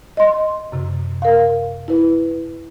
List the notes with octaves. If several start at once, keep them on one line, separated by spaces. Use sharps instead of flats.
D#5 C6
F#2 C3
A#4 F5
E4 B4